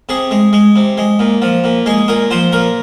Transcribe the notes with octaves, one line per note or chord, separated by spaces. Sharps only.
C3 G#4
G#3
G#3
C3
G#3
A#2
F3
A#2
G#3 G#4
A#2 A#4
F3 C5
A#2 A#4